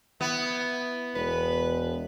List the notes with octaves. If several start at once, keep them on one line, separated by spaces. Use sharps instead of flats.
B3 E4
E1 B4